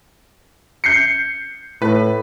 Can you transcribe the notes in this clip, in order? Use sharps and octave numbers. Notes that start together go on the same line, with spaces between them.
G6 C7 C#7
A2 B4